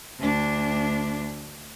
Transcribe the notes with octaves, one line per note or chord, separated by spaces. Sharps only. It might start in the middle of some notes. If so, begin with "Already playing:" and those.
D2 D4